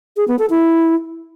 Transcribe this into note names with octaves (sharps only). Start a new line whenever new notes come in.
G#4
B3
A4
E4